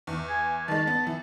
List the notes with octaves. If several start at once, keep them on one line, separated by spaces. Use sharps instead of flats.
E2
G#5
D#3 G#3 A5
B3
E3